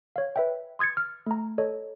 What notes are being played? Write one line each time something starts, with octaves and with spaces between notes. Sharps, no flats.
C#5 F5
B4 E5 G5
C6 D#6 G#6 A6 C#7
F6
A3 A#5
A4 C#5 D#5